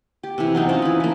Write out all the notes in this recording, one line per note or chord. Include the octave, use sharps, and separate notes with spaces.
G4
C3 E3
F#3 C4 D#4
C4 C#4 F4
E3 B5
F3 A#3